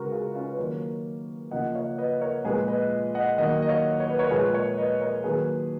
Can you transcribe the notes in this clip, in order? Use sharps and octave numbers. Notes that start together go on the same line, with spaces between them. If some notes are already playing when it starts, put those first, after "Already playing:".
Already playing: C#3 G#3 F#4 G#4 A#4 B4
F4 G#4
C#4 F4
B4
D#3 F#3 A#3 A#4 C#5
C#3 F3 A#3 D#5 F#5
C#5 F5
B4 D#5
A#4 C#5
A#2 F3 G#3 G#4 B4
B4 D#5
D#5 F#5
D#3 F#3 A#3 D#5 F#5
D#5
C#5 F5
C#5
B4
A#4 C#5
A#2 F3 G#3 G#4 B4
A#4 C#5
B4 D#5
A#4 C#5
D#3 F#3 A#3 G#4 B4